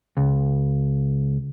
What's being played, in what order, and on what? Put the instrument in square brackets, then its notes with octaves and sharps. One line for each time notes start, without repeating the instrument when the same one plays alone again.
[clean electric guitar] C#2